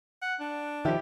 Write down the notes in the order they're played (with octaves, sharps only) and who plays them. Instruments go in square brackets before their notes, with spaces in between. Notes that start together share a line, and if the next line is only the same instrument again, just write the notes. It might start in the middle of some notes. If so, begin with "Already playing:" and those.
[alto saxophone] F#5
D4
[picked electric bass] D#3 F3 [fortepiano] E4 G4